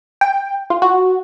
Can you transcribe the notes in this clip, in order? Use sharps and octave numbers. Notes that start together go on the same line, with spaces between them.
G5
F4
F#4